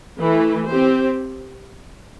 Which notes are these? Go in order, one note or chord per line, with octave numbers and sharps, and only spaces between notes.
E3 A3 E4
C4 G4 C5